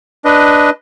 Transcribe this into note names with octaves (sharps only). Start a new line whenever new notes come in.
D4 B4 D#5